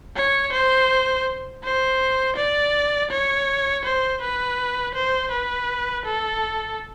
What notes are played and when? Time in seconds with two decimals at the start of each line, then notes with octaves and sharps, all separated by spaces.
0.16 C#5
0.53 C5
1.64 C5
2.36 D5
3.10 C#5
3.85 C5
4.22 B4
4.95 C5
5.31 B4
6.06 A4